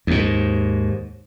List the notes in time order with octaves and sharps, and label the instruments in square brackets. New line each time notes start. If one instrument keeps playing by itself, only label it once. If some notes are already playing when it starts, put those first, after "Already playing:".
[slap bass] D#2 G#2